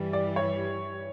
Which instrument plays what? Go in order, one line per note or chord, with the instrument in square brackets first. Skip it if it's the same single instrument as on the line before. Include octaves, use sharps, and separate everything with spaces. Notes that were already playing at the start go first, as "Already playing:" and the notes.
Already playing: [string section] G2 E3 G3
[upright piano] D5
C#5